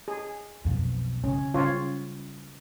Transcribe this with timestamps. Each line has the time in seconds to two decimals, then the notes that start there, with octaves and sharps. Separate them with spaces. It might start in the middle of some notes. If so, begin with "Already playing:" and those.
0.08 G#4
0.65 B1 F2
1.24 C#3 C#4
1.54 C#3 G3 F4 C#5